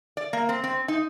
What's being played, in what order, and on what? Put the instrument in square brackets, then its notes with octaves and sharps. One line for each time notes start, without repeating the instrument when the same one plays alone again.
[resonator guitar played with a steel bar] D5
A#3
C4
C4
D#4